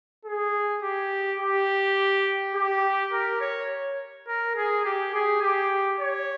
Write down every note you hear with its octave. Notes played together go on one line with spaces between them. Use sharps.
G#4
G4
G4
G4
A#4
C#5
A#4
G#4
G4
G#4
G4
C#5